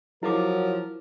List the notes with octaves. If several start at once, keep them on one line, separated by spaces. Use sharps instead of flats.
F3 F#3 E4 A#4 D6